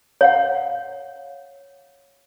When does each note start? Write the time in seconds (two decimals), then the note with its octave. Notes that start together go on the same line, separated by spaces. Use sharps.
0.21 C#5 F5 F#5